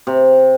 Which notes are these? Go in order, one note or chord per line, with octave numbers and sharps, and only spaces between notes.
C3